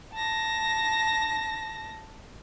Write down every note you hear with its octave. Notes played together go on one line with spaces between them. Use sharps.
A5 A#6